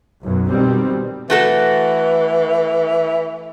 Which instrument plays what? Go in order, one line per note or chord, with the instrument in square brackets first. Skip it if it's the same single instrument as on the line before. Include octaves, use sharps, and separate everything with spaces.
[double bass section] B1 F#2
B2 D#3 G3 C4
[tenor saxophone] E3 [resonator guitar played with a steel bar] A3 F#4 A4